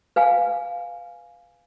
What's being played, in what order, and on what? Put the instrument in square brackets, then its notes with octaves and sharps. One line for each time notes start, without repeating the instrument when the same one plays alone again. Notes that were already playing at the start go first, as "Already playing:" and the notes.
[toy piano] B4 F5 G#5